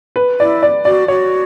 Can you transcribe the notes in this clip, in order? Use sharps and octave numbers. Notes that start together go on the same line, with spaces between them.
B4
E4 D5
D5
F#4 D5
F#4 C#5